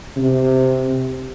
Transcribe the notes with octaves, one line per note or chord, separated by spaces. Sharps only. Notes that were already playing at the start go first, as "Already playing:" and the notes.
C3